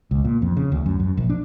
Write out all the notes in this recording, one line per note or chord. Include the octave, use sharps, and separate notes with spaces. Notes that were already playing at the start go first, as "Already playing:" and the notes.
C#2
A#2
F2
C#3
D2
F#2
F#2
A#1
D4